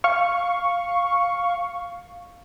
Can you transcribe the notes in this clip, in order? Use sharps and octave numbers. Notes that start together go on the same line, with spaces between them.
F5 C#6